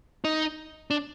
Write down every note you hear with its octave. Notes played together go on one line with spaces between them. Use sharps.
D#4
D4